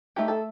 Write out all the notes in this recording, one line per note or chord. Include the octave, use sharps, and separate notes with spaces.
A3 D#4 G4
A4